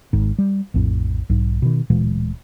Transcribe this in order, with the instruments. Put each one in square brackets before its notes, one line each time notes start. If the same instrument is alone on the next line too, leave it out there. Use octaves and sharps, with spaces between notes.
[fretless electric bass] G#1 G#2
G3
A#1 F2 A2
B1 G#2
B2 D#3
D1 A#2 E3 G#3